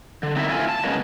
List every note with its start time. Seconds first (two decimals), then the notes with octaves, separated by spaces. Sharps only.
0.23 D3
0.36 C4 D#4 E4 A#4 D5 E5
0.48 D4 E4 F4 G#5
0.69 A5
0.84 F#2 C#3 G#3 A#3 B3